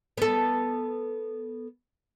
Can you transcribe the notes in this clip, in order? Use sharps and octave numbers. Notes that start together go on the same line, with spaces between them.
B3 A4